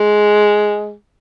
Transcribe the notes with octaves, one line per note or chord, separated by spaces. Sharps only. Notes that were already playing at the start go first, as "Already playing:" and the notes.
Already playing: G#3